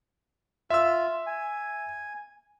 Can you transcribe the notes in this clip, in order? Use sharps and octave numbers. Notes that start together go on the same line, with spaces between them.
F4 E5 E6
G#5